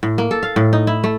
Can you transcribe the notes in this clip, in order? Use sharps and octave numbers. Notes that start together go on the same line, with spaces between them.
A2
A#3
A4
F5
A2
D#4
E4
A3